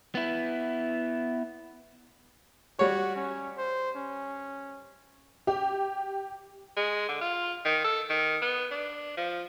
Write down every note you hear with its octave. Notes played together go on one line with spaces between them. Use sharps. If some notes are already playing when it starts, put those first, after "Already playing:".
B3 E4
G3 F#4 C#5
C#4
C5
C#4
G4
G#3
D3
F4
D#3
A4
D#3
B3
D4
F3